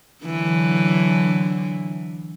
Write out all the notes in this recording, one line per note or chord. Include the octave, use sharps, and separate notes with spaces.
D3 E3 F#3